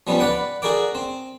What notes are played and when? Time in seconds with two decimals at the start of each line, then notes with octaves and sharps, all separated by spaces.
0.07 F3 G3 B3 C#4
0.19 B4 D5 F#5 G5
0.62 F#4 G#4 A#4 D5 G5 D6
0.95 C4